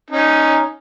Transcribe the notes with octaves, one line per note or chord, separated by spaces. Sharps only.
C#4 D#4